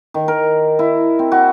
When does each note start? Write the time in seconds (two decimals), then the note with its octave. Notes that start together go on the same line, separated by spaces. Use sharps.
0.14 D#3
0.28 A#4
0.79 E4
1.19 C4
1.32 F#4